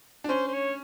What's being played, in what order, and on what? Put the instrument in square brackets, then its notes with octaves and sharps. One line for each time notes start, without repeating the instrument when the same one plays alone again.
[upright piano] D4
[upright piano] C#4 [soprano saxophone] C5
[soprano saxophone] C5
C#5